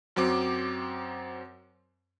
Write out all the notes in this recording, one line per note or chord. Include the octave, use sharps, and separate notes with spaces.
F#2 F#3 C4 D6